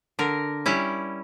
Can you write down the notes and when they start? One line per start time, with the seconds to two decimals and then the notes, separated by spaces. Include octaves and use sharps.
0.19 D3 A#4
0.66 G3 C#4 E4